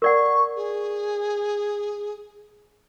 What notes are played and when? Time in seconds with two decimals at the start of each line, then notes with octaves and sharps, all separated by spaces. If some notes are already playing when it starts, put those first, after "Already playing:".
0.02 A#4 D5 F#5 C#6
0.55 G#4